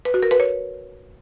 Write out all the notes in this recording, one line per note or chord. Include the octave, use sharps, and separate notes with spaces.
B4
F#4
A#4
B4
C#5